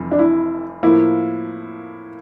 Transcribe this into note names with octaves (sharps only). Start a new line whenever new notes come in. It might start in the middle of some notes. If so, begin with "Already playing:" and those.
Already playing: F1 F2 E3 G3
D4
E4
A2 F3 A#3 E4